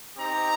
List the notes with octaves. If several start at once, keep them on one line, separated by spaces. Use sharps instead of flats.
C4 D#4 G4 A#5